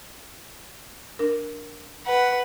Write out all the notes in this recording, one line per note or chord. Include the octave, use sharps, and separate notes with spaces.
D4 A#4
B4 F#5